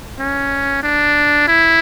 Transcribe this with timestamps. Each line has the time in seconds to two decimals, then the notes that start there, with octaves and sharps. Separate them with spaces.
0.19 C#4
0.83 D4
1.48 E4